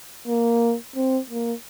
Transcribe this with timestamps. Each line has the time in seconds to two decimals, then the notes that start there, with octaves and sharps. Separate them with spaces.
0.27 A#3
0.96 C4
1.30 A#3